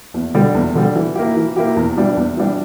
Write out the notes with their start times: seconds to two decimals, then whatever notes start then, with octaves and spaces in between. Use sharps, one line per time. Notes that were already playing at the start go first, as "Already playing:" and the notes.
0.14 E2
0.35 D3 G3
0.54 E2
0.75 D3 G3
0.95 E3
1.15 A#3 E4 G4
1.36 E3
1.56 A#3 E4 G4
1.76 E2
1.97 E3 G3 D4
2.17 E2
2.37 E3 G3 D4